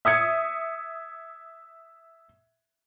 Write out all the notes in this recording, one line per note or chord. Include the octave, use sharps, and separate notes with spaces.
E5 D#6 G#6 C#7